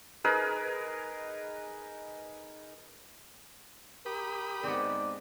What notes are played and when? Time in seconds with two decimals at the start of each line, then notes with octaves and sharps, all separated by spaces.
0.24 D#4 G#4 A#4 B4
4.06 G4 A#4 B5 D#6
4.64 G#2 B3 C4 D5